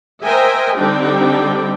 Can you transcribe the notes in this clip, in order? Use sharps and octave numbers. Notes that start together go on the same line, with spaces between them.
A#4 C5 D#5 E5 G5 G#5
D3 G3 C4 D4 D#4 G5